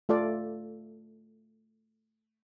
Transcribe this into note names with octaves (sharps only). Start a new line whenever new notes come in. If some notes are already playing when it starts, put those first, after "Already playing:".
A3 F4 A4 D5 F5